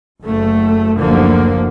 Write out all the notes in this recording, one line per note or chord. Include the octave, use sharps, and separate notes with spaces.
F#1 A3
F#1 D2 D3 F3 A#3